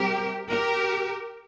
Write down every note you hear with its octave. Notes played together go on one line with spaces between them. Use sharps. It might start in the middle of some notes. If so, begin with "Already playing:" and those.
Already playing: C3 G3 C4 G4 A#4
G4 A#4